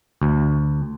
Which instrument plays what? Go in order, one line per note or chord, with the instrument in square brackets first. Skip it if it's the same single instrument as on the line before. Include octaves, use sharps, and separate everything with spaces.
[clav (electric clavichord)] D2